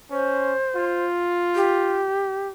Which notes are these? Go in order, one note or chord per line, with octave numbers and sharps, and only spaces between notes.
C#4 C5
F4
G4